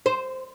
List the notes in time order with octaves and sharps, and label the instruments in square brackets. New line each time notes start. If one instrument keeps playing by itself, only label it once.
[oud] C5